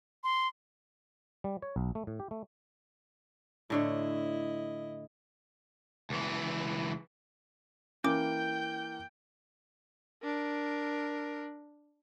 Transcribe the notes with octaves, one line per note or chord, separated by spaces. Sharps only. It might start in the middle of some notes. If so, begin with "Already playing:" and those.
C6
G3
C#5
B1
A3
A2
G4
A3
A2 D3 E4 C#5 D#5
C#2 E3
E3 A#3 C#4 G5 D6 G6
D4 A#4